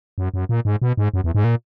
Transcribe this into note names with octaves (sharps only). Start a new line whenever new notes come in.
F#2
F#2
A#2
G#2
B2
G#2
F#2
E2
G#2
A#2